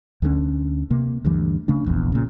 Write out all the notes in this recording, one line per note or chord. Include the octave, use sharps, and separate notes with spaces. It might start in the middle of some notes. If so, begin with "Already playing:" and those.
D2 D3 F3 C#4
C3 A#3
D2 G2 E3
C#3 A3 D4
F1 A#1 E2
A#2 C#3